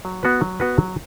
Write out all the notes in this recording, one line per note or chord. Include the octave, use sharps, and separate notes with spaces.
F#3
B3 F#4 B4
F#3
B3 F#4 B4
F#3